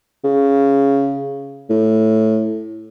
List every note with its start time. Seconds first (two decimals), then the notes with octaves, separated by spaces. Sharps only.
0.24 C#3
1.70 A2